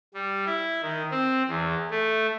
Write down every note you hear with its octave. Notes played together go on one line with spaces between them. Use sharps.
G3
E4
D#3
C4
E2
A3